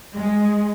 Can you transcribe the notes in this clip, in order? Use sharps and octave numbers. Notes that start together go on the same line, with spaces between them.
G#3